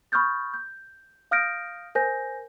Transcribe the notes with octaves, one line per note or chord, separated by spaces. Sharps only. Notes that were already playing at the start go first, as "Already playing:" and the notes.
B5 C#6 D#6 F6 G6 A6
G6
F5 D#6 F6 G6 A#6 D7
A#4 C5 G#5 G6 A#6